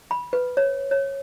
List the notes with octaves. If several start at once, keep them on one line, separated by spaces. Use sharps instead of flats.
B5
B4
C#5
C#5